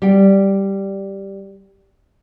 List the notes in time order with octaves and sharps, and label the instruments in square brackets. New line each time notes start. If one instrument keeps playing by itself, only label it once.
[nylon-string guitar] G3 D5 G5